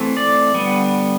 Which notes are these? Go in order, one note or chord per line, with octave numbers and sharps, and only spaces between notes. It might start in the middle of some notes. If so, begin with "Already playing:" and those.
Already playing: E3 A3 C4
D5
D3 G3 B3